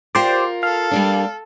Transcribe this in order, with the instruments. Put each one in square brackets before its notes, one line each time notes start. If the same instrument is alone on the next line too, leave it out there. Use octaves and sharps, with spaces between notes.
[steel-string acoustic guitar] F4 A#4 [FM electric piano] G4 C5 D5
[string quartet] A4 [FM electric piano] F5
[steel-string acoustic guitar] G3 A#3 D4